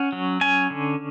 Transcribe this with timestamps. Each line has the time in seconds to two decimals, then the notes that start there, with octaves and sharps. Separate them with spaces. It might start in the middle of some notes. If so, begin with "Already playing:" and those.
Already playing: C#4 F#5
0.12 F#3
0.41 C#4 G#5
0.70 D3